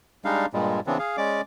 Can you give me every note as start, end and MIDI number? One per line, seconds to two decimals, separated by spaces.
0.25 0.46 55
0.25 0.46 56
0.25 0.46 62
0.25 0.46 63
0.25 0.46 77
0.54 0.80 43
0.54 0.80 46
0.54 0.80 55
0.54 0.80 56
0.87 0.98 49
0.87 0.98 52
0.87 0.98 59
0.87 0.98 60
0.87 0.98 62
0.99 1.16 68
0.99 1.16 77
1.17 1.41 56
1.17 1.41 61
1.17 1.41 74
1.17 1.41 86